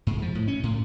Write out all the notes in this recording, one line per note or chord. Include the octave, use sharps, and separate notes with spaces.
G#2
F3
A2
C#4
A2